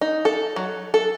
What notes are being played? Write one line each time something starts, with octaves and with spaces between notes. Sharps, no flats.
D#4
A4
F#3
A4